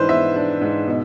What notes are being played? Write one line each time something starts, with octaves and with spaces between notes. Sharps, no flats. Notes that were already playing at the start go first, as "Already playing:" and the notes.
Already playing: G#2 E3 D4 B4 C5
B3 E5
D4
G#2
B2